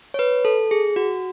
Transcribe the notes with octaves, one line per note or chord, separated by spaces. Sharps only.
C#5
B4
A4
G#4
F#4